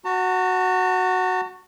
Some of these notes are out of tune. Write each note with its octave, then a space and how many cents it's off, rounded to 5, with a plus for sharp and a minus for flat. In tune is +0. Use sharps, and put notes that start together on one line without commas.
F#4 +0 A5 +40